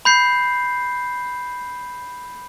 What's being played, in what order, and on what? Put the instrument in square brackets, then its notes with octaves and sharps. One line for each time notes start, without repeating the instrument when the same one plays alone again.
[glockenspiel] B5 G6 C7